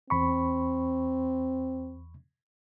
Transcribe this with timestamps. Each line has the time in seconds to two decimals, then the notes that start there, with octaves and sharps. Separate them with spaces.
0.10 E2 C4 B5 C#6